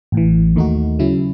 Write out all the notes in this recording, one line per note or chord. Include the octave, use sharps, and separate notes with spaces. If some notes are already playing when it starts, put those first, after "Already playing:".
A1 A2 E3
D#2 D#3 A3 D#4 F#4
C#3 F#3 C#4 E4